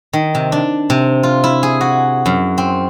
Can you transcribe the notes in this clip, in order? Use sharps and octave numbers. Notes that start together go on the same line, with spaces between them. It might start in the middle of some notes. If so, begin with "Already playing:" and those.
D#3
C3
D4
C3
F4
E4
G#4
F#4
F#2
C4